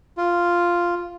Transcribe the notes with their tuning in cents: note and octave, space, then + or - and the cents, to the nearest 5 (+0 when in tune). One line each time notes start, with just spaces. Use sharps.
F4 -5